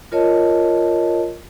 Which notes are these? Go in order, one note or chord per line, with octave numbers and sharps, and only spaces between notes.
F4 A#4 C#5 D#5 A5